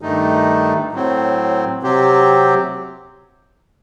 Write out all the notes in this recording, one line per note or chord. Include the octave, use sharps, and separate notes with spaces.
G2 D#3 A3 D#4
A2 F#3 C4
C3 F#3 C4 G4